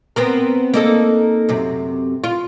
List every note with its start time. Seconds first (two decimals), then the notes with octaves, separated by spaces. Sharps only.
0.16 B3 C4 A#4
0.74 A#3 D#4 A4
1.49 F#2 C3
2.24 F4